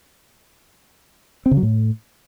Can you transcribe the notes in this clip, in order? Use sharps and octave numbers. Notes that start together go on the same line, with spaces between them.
C4
C#3
F#3
A2